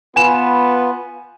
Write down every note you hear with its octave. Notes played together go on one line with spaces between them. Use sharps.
B3 F4 B4 G#5 E7